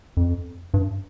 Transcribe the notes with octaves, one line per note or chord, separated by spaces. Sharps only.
F2
G2